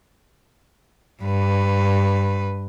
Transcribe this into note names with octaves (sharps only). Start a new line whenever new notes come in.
G2 B4